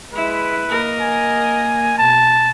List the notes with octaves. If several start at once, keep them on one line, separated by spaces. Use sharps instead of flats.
G#3 E4 B4
A#3 A#4 D#5
G#5
B2 A5